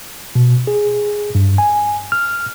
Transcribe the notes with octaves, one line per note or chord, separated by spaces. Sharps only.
B2
G#4
G2
G#5
F6